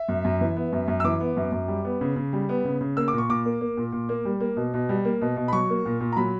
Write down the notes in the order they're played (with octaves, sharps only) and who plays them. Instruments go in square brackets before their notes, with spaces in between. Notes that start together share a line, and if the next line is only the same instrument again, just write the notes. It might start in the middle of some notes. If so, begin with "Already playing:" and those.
Already playing: [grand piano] E5
F#2
F#2
E3
B3
F#2
F#2
E6
E3 D6
B3
F#2
F#2
G3
B3
C#3
C#3
G3
B3
C#3
C#3
A#3 E6
A#2 D6
C#6
A#2 D6
A#3
A#3
A#2
A#2
A#3
G3
A#3
B2
B2
G3
A#3
B2
B2
B5
F#3 C#6
A#3
A#2
A#2
A#5
F#3 B5